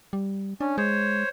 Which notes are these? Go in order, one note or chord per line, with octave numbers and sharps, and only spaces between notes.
G3
C#4 D4
G#3 C5 C#5